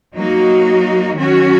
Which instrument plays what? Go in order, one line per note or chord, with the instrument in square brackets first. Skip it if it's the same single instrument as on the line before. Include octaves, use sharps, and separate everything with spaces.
[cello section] F#3 A#3 D#4 F#4
D#3 F#3 C#4 F#4